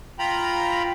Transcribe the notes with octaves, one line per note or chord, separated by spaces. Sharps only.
F4 G5 A#5 B5